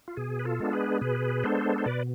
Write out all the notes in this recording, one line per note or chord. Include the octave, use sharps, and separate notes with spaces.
F4
B2 G#4
B4
F4 A4
G#3 B3 D4
G#4 B4
B2 G#4 B4
G#3 B3 D4 A4 C5
C5
B2 B4 D5